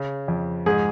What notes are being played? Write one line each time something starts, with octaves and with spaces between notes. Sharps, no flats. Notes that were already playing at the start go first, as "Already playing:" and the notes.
Already playing: C#3
F2
G#2 G#4